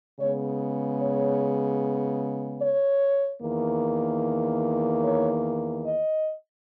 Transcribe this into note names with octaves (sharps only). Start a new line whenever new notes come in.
C#3 G#3 B3 C#5
C#5
C#5
E2 D#3 A#3
C#5
D#5